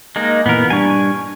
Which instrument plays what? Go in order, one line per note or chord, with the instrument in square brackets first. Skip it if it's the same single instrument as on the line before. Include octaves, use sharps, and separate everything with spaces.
[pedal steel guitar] G#3 A#3 D#4
[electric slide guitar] A#2 E3 [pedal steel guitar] B3 A#4
[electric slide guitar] G3 D4 [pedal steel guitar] G#5 C#6